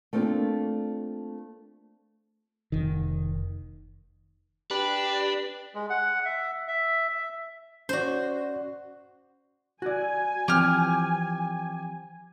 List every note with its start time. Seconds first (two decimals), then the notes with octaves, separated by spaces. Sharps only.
0.13 A3 A#3 C4 D4 F4 A4
2.72 F1 D#3
4.71 D4 G4 B4
5.75 G#3
5.90 F#5
6.25 E5
6.68 E5
7.09 E5
7.89 C#4 F#4 C5 D5
9.82 F#4 D5 G#5
10.48 E3 F3 C4 G4 F6